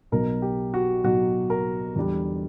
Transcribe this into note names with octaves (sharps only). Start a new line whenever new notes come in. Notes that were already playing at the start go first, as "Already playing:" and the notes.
B1 B2 F#3 A#4
G4
F#4
B1 B2 F#3 F#4
A#4
E2 D3 G3